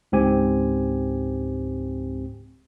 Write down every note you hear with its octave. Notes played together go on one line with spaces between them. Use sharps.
C#2 G#2 C4 G4 G#5